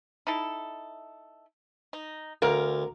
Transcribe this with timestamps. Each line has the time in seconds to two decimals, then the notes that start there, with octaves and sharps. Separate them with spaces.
0.27 D#4 E4 A4
1.93 D#4
2.42 D2 B2 A#4 F5